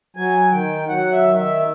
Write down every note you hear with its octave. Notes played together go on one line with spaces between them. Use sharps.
F#3 G#5
D#3 G5
F#3 F#5
E5
D#3
E5